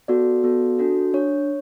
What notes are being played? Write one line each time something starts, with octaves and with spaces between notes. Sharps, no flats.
B3 F#4 A4 D5
B3 F#4 A4
D4 F#4 A4
D4 C#5